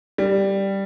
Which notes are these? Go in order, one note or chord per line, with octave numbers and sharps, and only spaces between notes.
G3